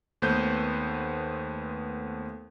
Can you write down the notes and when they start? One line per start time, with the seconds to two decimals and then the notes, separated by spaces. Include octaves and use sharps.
0.22 D#2 A3 B3 B4 C5 G6